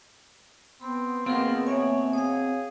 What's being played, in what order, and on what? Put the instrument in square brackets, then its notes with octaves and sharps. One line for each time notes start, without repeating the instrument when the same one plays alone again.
[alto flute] B3 [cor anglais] C4 [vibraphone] B5
[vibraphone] A#3 G#4 A#4 [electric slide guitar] C4 F#4 [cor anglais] F4
[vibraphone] A#3 E5 G#5 [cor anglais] C#5
[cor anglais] G#4 [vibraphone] C#5 F5